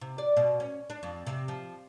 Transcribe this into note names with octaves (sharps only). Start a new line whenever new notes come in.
C3
D5
B2
C#4
D4
F2
C3
F3